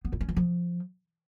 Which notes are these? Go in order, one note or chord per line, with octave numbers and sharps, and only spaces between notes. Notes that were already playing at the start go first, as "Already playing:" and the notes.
B3
E4
C#4
E3
F3